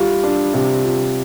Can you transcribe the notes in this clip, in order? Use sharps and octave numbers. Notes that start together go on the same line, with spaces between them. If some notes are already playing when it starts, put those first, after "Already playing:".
Already playing: G3 F4
D4
C3
F4